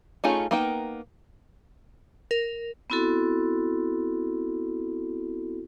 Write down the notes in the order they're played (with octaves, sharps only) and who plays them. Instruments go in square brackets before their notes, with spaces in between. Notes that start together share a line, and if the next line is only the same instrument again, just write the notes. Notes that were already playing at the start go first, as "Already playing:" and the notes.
[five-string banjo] A3 C#4 D#4 F4 G#4
A#3 B3 D#4 A#4 G5
[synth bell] A#4
[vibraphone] B3 C4 E4 F#4 A4